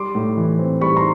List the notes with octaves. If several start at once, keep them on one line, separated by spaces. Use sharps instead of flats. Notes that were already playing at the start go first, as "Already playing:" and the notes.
Already playing: G3 C6 D6
A2
E3
C4
G3 B5 C#6
A#5 C6